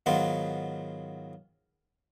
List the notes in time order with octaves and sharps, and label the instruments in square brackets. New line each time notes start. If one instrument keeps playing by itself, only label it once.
[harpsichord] G#2 D#3 F#3 B3 F4